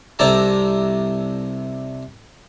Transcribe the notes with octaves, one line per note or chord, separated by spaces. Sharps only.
C2 C3 A4 D5 A5 A#5